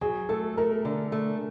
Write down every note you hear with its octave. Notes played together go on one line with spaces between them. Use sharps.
F#3 G#4
A3 A4
A3 A#4
D3
A3